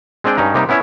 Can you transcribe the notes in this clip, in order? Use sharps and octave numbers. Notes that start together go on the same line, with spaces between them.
G#3 C4 D4 G#4 G5
G2 C#4 D#4 A#5
C3 G3 A#3 D#4 G4
B3 C#4 E4 C#5 E5